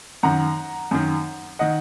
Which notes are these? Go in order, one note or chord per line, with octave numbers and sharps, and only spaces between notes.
F#2 D#3 F#5 A#5
F#2 D#3
D#3 D#5 F#5